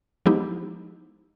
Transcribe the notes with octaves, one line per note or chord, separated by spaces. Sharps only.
F3 G#3 B3 D#4 E4 G4